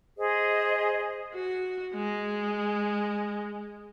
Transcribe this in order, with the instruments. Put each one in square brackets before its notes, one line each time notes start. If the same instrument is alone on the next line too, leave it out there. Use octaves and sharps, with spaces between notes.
[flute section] G#4 C5 D#5
[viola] F#4
G#3